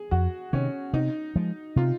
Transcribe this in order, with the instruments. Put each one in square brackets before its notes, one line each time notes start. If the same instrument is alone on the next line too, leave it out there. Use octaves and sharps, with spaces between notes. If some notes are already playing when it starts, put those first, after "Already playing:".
Already playing: [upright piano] G#4
[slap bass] F2 [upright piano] F#4
[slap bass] C3 D#3 [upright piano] C#4
[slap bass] C3 [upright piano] D#4
[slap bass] F3 G#3
[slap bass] C3 [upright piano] F4